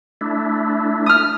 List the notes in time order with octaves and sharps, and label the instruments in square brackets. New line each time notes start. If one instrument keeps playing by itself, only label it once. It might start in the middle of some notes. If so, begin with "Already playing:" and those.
[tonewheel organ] A3 D4 E4
[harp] D#6 F6